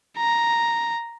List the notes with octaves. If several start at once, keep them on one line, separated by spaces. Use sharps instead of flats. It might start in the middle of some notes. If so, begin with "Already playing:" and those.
A#5